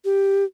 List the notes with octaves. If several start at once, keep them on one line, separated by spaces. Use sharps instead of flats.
G4